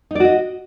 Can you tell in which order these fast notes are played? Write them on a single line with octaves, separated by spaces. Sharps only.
D#4 D5 F#4 D#5